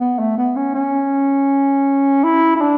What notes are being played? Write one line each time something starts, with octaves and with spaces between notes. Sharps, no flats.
B3
A3
B3
C#4
C#4
E4
E4
D4